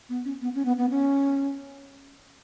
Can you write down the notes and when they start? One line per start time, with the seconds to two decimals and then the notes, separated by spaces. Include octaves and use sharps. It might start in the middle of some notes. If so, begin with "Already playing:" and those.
0.09 B3
0.25 C#4
0.42 B3
0.55 C#4
0.65 B3
0.78 B3
0.90 C#4